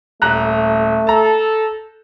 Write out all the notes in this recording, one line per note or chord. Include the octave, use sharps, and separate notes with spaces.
D#1 A3 A#5 F#6
A4 A5 A#5